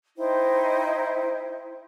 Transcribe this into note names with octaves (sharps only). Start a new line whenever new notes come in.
D#4 E4 C5 G5